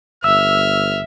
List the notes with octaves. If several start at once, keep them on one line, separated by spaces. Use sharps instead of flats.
G1 E5 E6 F6